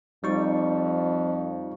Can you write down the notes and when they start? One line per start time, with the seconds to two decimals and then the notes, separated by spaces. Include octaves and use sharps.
0.24 F2 G3 D#4 C#6